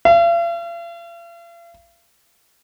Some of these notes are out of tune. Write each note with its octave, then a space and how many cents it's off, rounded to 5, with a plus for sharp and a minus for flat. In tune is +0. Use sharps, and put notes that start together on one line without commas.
F5 -45